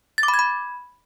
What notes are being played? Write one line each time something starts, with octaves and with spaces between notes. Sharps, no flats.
A6
D6
B5
G#6
B5